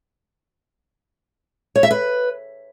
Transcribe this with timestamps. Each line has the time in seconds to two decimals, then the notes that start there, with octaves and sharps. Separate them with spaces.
1.76 C#5
1.83 E5
1.91 B4